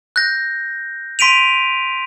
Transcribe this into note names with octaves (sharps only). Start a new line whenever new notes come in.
F#6 G6 A#6
C6 B6 D7 D#7 F7